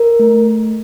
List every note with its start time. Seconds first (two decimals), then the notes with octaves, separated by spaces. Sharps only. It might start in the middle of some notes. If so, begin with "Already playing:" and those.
Already playing: A#4
0.19 A3